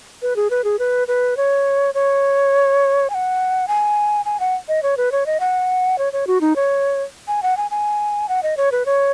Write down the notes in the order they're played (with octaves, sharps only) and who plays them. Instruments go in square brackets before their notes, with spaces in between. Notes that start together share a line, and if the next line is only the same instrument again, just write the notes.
[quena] B4
G#4
B4
G#4
B4
B4
C#5
C#5
G#5
F#5
G#5
G#5
F#5
D#5
C#5
B4
C#5
D#5
F#5
C#5
C#5
F#4
D#4
C#5
G#5
F#5
G#5
G#5
F#5
D#5
C#5
B4
C#5